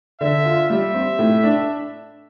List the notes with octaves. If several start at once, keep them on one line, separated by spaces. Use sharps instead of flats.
D3 E5
F4
G3 E5
C4
A2
D4